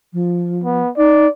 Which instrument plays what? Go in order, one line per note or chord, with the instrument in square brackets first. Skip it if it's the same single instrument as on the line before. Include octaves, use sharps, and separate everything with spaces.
[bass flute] F3
[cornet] B3
[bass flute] D#4 [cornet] D5